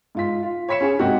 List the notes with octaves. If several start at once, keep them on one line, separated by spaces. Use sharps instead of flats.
G#2 F4 B6
F4
C#5 B5 B6 C#7 E7
C#4 G#4
G#2 C3 A#3 D#4 F#4 G4